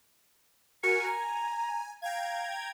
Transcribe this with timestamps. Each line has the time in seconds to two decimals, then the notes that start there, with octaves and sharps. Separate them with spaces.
0.83 F#4 A#4 G#5 C#7
1.06 G#5 A#5
2.02 F5 G5 A#5 G#6